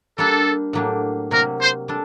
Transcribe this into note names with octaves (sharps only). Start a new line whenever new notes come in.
G3 A#3 D4 G4 A4
A2 F#3 A#3 D4 G4
C3 F#3 A#3 A#4
C5
G3 D4 A4